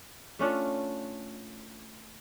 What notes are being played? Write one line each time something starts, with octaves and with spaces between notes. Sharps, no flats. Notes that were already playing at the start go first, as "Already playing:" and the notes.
A3 C#4 D4 F4